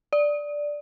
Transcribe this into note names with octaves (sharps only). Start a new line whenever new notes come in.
D5